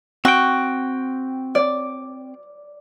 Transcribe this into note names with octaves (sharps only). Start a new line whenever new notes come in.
C4 F#4 G5
D5